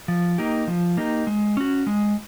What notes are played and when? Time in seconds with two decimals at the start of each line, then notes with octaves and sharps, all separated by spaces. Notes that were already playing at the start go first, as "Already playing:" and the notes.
0.08 F3
0.38 A#3 D#4 G4
0.68 F3
0.97 A#3 D#4 G4
1.27 G#3
1.57 C#4 F#4
1.87 G#3